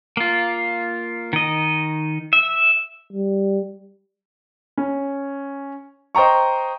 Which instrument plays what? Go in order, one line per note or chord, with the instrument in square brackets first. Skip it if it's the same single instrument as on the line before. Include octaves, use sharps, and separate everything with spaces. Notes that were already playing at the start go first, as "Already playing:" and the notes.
[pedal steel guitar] A#3 F4
D#3 D#5
E5
[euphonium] G3
[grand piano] C#4
C5 D#5 G5 A#5 C#6